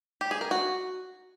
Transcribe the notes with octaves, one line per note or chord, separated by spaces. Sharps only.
G4
G#4
A#4
F#4